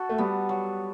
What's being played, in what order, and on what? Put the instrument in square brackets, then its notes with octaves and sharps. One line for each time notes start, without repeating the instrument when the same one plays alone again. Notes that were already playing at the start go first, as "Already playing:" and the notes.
Already playing: [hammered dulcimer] F#4 A4
[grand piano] A3
[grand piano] G3 [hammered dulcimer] B3
[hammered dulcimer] F#3